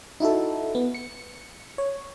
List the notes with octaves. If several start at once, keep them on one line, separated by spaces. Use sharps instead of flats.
D#4 E4 F#4 A4
B3
C#7
C#5